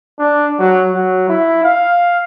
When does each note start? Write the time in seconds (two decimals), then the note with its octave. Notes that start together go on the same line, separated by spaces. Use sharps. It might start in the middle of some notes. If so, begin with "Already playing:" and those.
0.19 D4
0.59 F#3
0.95 F#3
1.29 E4
1.64 F5